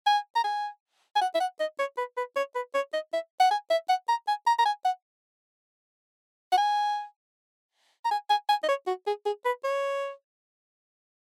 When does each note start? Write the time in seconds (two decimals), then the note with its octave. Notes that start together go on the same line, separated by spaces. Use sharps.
0.06 G#5
0.36 A#5
0.44 G#5
1.16 G#5
1.21 F#5
1.35 E5
1.40 F#5
1.60 D#5
1.79 C#5
1.97 B4
2.17 B4
2.36 C#5
2.55 B4
2.74 C#5
2.93 D#5
3.13 E5
3.40 F#5
3.51 G#5
3.70 E5
3.89 F#5
4.09 A#5
4.28 G#5
4.47 A#5
4.59 A#5
4.66 G#5
4.85 F#5
6.52 F#5
6.58 G#5
8.05 A#5
8.11 G#5
8.30 G#5
8.49 G#5
8.64 D#5
8.68 C#5
8.87 F#4
9.07 G#4
9.26 G#4
9.45 B4
9.64 C#5